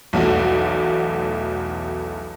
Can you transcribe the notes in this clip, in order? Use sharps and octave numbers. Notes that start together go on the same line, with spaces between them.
B1 E2 A3 F#4